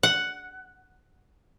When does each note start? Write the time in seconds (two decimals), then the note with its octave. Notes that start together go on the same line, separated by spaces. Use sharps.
0.03 F#5